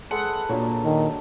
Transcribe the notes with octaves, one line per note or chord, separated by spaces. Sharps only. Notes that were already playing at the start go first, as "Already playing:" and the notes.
G#3 A4 B4 F#5
A#2 F#3 D4
D#3